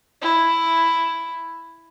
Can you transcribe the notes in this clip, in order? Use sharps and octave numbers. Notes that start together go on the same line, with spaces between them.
E4